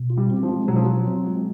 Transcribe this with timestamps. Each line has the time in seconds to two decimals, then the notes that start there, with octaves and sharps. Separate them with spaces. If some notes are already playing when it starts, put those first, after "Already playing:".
Already playing: B2
0.10 F4
0.17 G3
0.30 C4
0.43 F3
0.49 G#3
0.68 B2 F#3
0.76 F3
0.85 F#3 F4
1.08 C4
1.27 G#3